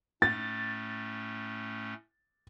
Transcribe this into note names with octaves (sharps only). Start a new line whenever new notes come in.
A2 A3 C#4 A6